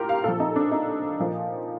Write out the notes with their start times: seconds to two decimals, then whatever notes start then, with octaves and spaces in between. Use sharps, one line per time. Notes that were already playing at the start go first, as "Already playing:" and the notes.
Already playing: A2 F4 G4 A#4
0.09 F5
0.24 A#2 F3 A4
0.40 D#4
0.56 D4
0.71 D#4
1.20 A#2 F3